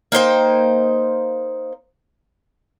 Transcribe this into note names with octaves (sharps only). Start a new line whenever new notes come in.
A#3 D#4 C5 G5